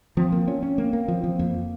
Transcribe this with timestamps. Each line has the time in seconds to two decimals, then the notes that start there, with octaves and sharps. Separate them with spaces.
0.17 F3 C4
0.32 A#3
0.48 C#4
0.63 C#4
0.78 A#3
0.93 A#3
1.08 F3
1.24 F3
1.38 F2 A#3